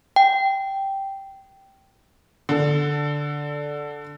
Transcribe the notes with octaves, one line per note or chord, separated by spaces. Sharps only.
G5
D3 A4